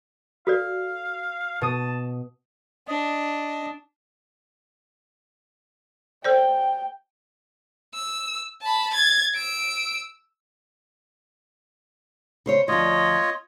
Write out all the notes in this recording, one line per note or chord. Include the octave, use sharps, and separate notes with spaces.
F#4 A4 D5 F5
B2 A5 D#6
D4 D#5
A4 C5 D5 G5
E6
A5 B5
G#6 A6
E6 D7
C#3 C5 C#5
D2 F3 F4 C#5 D#5